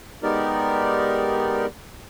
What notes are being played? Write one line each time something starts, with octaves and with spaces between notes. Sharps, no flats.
G#3 B3 D#4 G4 A#4 D5